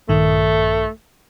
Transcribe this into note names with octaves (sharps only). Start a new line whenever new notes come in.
A#1 G2 D#3 A3